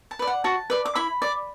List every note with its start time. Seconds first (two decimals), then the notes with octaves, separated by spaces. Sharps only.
0.11 A5
0.19 B4 D5
0.27 F#5
0.44 F#4 A5
0.70 B4 D5
0.85 D6
0.95 E4 B5
1.22 D5